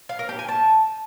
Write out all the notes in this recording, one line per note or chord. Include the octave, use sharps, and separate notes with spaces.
F5
A#4
G4
G#5
A5